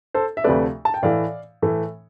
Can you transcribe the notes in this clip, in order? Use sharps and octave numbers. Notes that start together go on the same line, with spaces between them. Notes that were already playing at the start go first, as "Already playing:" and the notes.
A4 C5
E5
D2 C3 F3 A3 B4 D5
A5
G5
A2 E3 A3 D5 F5
A2 E3 A3